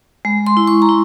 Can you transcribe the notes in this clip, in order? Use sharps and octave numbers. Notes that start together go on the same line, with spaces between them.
G#3
C6
E4
C#6
A#5
E4